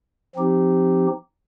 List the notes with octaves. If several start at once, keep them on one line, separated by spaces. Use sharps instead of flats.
F3 C4 D#4 G4